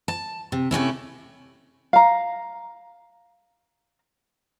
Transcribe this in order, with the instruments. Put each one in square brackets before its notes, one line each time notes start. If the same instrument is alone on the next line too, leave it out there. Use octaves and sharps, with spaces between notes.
[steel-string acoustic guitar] A5
C3
C3 A3 C#4 E4
[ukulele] F5 A#5